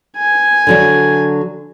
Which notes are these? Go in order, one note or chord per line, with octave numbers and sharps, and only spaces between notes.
G#5
D3 F#3 D4